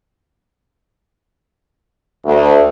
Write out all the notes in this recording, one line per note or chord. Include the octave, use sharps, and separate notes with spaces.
D2